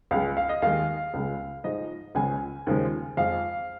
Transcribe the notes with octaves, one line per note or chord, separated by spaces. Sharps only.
C#2 C#3 G#3 F5
F5
D#5
D#2 D#3 G#3 F5
C#2 C#3 G#3
G#2 F3 G#3 D#5
C#2 C#3 F3 G#3 G#5
D#2 C#3 F3 G#3
F2 F3 G#3 F5